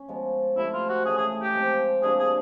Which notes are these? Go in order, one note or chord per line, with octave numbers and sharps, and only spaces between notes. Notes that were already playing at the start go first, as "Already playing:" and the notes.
Already playing: C#4
F3 G#3 B3
C3 F3 A3 C4 E4
F4
F#4
C#3 E3 A3 G#4
G#4
G4
F3 G#3 C4
C3 F3 A#3 D4 G#4
G#4